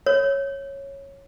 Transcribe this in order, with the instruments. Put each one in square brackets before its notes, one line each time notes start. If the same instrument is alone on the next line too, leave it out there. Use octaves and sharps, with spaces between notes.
[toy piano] C#5